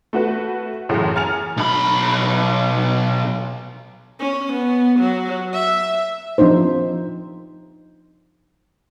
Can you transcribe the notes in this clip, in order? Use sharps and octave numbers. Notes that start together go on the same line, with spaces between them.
A3 F#4 B4
F#2 A2 C#3 E3
G#5 A#5 F6 A6 C#7 F7
B1 B5
C#4
B3
F#3
E5
F3 C4 D4 D#4 C5